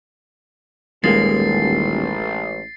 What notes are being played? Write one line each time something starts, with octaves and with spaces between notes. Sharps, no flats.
D#1 A1 G#3 A#3 A6 C7